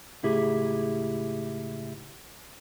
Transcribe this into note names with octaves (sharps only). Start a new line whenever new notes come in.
C#2 A2 E4 G4 G#4